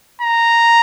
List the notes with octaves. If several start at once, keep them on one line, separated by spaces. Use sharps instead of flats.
A#5